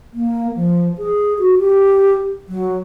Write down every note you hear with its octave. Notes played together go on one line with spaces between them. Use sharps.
A#3
F3
G#4
F#4
G4
F#3